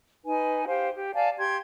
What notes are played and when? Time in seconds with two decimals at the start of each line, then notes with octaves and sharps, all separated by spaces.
0.25 D#4 B4 G#5
0.67 G4 C5 F5
0.95 G4
1.14 D5 F5 G#5 A5
1.38 G4 C6 G#6